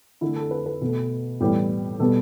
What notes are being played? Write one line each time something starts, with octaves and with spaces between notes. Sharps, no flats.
D3 A3 E4
A4
B4
B4
B2 A3
A2 E3 G3 B3 G4
B2 G3 B3 A4